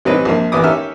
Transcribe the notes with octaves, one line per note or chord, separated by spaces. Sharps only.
A1 F#3 G3 C4 D#4 B4
A#1 F3 A#3
A1 E3 B3 D6 D#6
D#3 C#4 G4 E5 F6